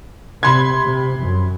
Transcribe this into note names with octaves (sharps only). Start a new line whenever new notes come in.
C3 B5 C6 G#6
C3
F#2